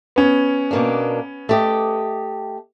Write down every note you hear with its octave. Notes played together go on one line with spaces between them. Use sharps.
B3 C#4
B2 A#3 D4
A3 G4 D#5